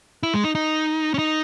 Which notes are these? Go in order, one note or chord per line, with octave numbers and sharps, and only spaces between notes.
E4
G#3
D#4
D#4
C#4
D#4